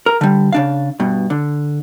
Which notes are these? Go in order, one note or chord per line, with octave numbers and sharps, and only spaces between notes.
A#4
D3 G3
C#3 D4 F5
G2 B2
D3